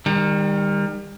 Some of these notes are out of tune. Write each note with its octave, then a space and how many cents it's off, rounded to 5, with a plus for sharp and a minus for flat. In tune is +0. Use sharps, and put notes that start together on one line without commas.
D#3 +0 G3 +35